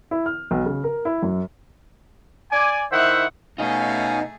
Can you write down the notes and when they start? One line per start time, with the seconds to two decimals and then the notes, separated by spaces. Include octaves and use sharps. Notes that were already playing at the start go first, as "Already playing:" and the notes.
0.11 E4
0.26 F6
0.51 B1
0.66 C#3
0.84 A#4
1.05 E4
1.23 F#2
2.52 D5 G#5
2.92 D#3 E4 C5 E5 F#5
3.58 B2 A3 C#4 D#4 G#4 D#5 F5